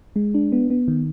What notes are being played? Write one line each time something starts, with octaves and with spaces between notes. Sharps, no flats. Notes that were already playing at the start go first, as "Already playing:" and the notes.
G#3
D4
B3
B3
D#3